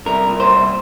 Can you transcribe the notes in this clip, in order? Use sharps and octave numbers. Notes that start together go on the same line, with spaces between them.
C2 A#4
A#2
C5
C2